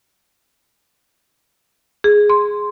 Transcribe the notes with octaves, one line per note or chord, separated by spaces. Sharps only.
G#4
C6